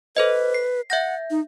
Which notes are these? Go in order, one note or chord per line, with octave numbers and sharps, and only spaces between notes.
A4 B4 C5 D#5
C7
E5 F#5 G6 A#6
D#4